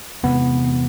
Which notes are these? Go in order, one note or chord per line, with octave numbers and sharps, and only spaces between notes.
E2 C3 E3 G#3 B3